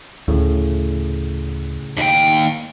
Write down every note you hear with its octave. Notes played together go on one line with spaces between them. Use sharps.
D2 A2 C#3
D#2 G5